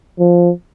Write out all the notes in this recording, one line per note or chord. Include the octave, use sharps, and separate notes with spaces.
F3